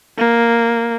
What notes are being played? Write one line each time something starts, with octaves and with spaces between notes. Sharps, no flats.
A#3